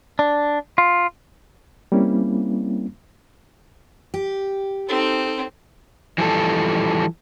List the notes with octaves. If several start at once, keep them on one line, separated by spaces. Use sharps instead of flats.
D4
F4
G3 A#3 C4 C#4 E4
G4
C4 D#4 A4
E3 F3 G3 A4